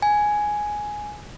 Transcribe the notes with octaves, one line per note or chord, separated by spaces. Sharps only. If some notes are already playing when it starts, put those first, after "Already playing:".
G#5